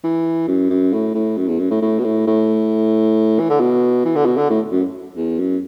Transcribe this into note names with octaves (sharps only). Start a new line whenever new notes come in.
E3
F#2
F#2
A2
A2
F#2
E2
F#2
A2
A2
B2
A2
A2
E3
D3
B2
E3
D3
B2
D3
A2
F#2
E2
F#2